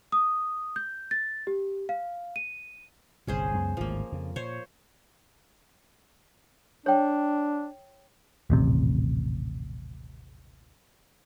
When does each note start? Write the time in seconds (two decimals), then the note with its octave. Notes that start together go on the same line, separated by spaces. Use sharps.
0.12 D#6
0.76 G6
1.11 A6
1.47 G4
1.89 F5
2.36 D#7
3.27 G1 C2 A#2 C#4 G#4 C5
3.54 C#2 F#2 B3
3.77 G#1 D2 A2 F3 A#3
4.12 F2 C#3
4.36 A#2 C5 C#5
6.86 D4 C#5 G5
8.50 D#1 A1 C3